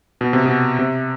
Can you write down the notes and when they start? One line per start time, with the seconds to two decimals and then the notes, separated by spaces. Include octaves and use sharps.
0.21 B2
0.33 C3
0.46 B2
0.79 C3